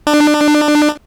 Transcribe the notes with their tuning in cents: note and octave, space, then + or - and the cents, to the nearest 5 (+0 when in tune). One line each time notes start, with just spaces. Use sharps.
D4 +25